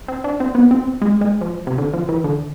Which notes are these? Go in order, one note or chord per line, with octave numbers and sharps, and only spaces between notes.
C4
D4
C4
B3
C4
G#3
G#3
F3
C3
D3
F3
E3
D3